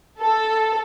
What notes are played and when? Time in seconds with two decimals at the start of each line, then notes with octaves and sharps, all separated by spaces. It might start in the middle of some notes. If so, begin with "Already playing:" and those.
0.20 A4